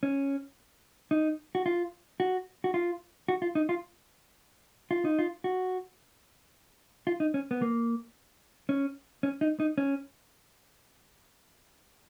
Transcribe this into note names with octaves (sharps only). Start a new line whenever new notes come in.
C#4
D#4
F#4
F4
F#4
F#4
F4
F#4
F4
D#4
F4
F4
D#4
F4
F#4
F4
D#4
C#4
B3
A#3
C#4
C#4
D#4
D#4
C#4